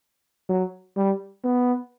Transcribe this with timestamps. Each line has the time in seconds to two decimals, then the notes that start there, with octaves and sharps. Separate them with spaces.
0.49 F#3
0.96 G3
1.44 B3